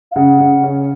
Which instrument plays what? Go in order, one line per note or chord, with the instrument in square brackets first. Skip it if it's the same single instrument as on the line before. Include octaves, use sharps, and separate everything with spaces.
[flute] F5
[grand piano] C#3 [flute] F#5
[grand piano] C#3
C#4